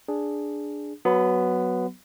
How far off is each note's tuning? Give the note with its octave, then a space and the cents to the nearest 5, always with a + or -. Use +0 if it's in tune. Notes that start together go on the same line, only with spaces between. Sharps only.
D4 +0 G#4 +0
F#3 +0 B3 +0 B5 +40